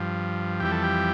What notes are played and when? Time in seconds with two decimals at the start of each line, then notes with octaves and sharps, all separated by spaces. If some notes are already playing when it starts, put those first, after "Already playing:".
Already playing: G2 F3
0.60 F2 E3 G3 G4
0.72 A4
0.83 G4